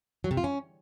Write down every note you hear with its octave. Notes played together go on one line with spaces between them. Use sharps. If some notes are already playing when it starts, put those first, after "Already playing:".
F#3
C3
F4
C#4